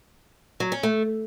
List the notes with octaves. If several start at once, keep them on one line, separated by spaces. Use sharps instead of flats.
F#3
C#4
A3